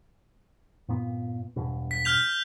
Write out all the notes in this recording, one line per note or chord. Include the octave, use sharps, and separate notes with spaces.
G2 A#2 B3
E1 G2 B2
B6
F6 G6 F7